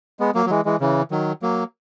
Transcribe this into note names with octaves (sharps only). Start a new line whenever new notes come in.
G#3 B3
F#3 A#3
F#3
E3 G#3
E3 G#3
C#3 E3
D#3 F#3
F#3 A#3